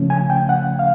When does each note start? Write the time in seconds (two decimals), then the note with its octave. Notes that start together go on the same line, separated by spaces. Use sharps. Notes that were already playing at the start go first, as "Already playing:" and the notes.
Already playing: C#3 F3 A3 C#4
0.10 G#5
0.30 G5
0.49 F#5
0.79 F5